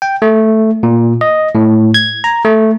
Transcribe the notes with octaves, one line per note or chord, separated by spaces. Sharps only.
G5
A3
A#2
D#5
A2
G#6
A#5
A3